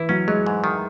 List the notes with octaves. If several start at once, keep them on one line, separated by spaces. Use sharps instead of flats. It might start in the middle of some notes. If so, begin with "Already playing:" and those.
Already playing: E3 E4
F#3 C#4
F#3 G#3
G#2
D#3